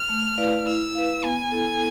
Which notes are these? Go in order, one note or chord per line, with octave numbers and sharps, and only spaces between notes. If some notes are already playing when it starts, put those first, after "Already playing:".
Already playing: F6
A3
E4 B4 D5 F5
E4 E6
B4 F5
B3 G#5
E4 A4